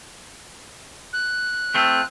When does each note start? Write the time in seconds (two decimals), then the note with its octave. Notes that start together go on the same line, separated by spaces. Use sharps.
1.13 F#6
1.74 A3 C4 F4